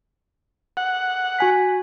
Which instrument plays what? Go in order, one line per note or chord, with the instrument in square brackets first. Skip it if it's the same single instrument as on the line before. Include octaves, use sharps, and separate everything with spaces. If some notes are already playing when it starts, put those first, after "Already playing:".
[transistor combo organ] F#5
[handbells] F#4 G#5 B6